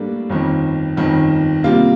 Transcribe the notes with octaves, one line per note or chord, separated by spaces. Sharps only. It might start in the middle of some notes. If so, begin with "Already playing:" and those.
Already playing: A2 G3 A#3 D4 A4
G1 F2 D#3
G1 F2 D#3
C3 G3 A#3 F4